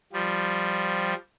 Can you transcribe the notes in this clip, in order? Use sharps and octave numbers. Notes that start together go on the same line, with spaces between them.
F3 G3